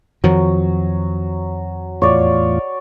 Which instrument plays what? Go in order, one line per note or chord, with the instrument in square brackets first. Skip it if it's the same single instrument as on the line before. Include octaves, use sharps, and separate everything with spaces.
[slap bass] F2 D#3 F3 [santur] F#3
[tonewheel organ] E2 A2 F4 [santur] C#5 D5